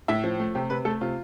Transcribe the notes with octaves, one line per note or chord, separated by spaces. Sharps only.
A2 E5
F3
A3
C3 G4
C3 B4
A3 A4
C3 F4